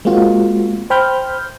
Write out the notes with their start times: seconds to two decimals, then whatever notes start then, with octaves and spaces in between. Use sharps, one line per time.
0.05 G#3 A#3 C4 F4 F#4
0.90 C5 G5 B5 F6 G6